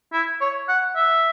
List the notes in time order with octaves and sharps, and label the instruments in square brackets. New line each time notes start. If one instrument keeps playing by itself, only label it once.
[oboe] E4
C#5
F#5
E5